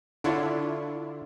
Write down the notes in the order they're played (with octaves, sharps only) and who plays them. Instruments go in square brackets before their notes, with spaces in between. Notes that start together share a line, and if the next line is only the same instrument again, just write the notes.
[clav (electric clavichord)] D3 C#5 [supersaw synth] D4 E4 F4